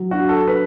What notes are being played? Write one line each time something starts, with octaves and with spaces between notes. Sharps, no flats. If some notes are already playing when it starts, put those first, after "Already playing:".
Already playing: F#3
D4 F#4
A4
B4